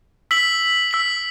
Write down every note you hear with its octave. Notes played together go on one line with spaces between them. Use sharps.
E6 B6 F#7
E6 B6 F#7